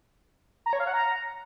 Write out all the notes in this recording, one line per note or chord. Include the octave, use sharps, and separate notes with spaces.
A#5
C#5
F5
F#5
A#5